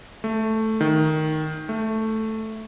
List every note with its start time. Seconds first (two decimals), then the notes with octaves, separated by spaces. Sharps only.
0.24 A3
0.81 D#3
1.69 A3